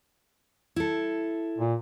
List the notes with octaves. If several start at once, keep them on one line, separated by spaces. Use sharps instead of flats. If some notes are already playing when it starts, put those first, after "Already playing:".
E4 A4
A#2